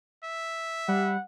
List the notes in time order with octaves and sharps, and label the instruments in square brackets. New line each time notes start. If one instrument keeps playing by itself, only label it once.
[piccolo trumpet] E5
[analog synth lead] G3 [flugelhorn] F#5